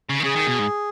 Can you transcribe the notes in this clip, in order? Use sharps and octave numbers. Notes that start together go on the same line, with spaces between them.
C#3
D#3
C#3 G#4
D#3
B2
G#2